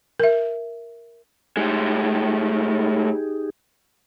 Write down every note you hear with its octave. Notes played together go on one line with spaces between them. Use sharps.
A#4 E5
A2 G#3 D#4 G4 G#4